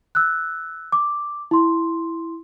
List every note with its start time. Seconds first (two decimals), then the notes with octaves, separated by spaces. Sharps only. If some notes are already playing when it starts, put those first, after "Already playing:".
0.15 E6 F#6
0.92 D6
1.51 E4 C6